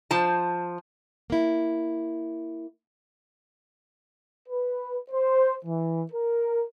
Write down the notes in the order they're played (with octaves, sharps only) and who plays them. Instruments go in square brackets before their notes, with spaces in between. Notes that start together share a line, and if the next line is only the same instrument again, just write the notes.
[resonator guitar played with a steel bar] F3 C5 A5
[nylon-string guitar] A#3 E4
[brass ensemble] B4
C5
E3
A#4